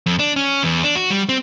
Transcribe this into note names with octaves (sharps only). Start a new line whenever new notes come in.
F2
D4
C#4
E2
D4
F#4
G3
C4